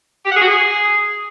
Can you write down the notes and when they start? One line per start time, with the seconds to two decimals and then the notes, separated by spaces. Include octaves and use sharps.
0.25 G4
0.30 F#5
0.36 G#4
0.42 F#4
0.47 G#4